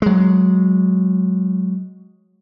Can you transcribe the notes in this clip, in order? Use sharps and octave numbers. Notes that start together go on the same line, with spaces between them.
F#3 G#3